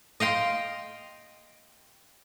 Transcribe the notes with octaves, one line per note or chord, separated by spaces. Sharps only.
D#5 F5 G5 C6